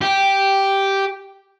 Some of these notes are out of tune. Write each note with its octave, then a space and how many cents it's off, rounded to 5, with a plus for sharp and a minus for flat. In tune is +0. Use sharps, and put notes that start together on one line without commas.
G4 -5